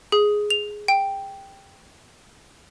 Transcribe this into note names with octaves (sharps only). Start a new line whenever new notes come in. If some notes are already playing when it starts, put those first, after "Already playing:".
G#4
F7
G5